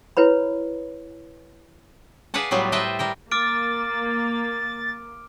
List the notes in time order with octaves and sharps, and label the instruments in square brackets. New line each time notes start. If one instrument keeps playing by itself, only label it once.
[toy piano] E4 B4 C#5 B5
[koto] G#4 B4 D5 F5 F#5 A5
A2 F#3 G3 B3 F4
B4 C5 D#5 E5 G5 A5
G3 A#4 G5
[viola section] A#3 [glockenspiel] D6 F6 D7 [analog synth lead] A6